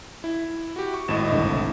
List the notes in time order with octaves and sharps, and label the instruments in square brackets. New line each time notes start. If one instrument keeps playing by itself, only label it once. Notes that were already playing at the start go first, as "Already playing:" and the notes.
[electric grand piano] E4
F#4 G4
C#6
[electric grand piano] G#1 A2 [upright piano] D#5 E7
[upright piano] C2 D3